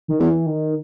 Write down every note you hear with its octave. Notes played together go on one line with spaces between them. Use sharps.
D#3
E2 E3
D#3